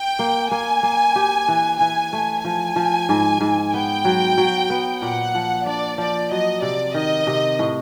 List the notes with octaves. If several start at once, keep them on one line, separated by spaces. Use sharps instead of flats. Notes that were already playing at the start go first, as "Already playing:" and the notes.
Already playing: G5
A#3
A#3 G#5
A#3
G4
E3
E3 G#5
A3
F3 G#5
F3
G#2
G#2
B3 G5
F#3
F#3
B3
A#2 F#5
F3
D4 D5
F3 D5
F#3 D#5
C3 D5
D#3 D#5
C3
A2